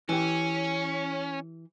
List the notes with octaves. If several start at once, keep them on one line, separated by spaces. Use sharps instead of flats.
E3 C#4 G4